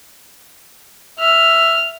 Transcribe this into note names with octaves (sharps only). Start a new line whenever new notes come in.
E5 F6